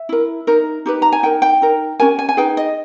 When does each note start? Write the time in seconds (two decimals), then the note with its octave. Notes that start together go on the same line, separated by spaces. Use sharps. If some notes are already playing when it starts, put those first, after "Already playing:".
Already playing: E5
0.09 E4 A#4
0.47 D#4 A#4
0.86 D#4 G4 B4
1.02 A#5
1.12 G#5
1.23 D#4 A#4 G5
1.42 G5
1.62 D#4 A#4
2.00 C#4 G4 A#4 G#5
2.19 G#5
2.29 G#5
2.37 D#4 G#4 B4 G5
2.57 D#5